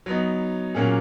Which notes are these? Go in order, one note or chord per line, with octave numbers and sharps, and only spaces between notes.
F#3 B3 D#4
A#2 F#3 A#3 C#4 G#4